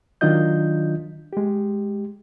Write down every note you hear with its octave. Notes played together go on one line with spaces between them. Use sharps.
D#3 F#3 D4 F4 D#5 G6
G#3 G4